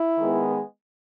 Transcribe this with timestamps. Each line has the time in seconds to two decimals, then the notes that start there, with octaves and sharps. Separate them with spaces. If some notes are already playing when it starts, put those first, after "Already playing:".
Already playing: E4
0.18 D#3 G#3 B3